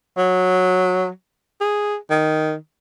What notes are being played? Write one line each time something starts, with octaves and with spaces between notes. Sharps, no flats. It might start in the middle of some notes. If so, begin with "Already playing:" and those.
F#3
G#4
D#3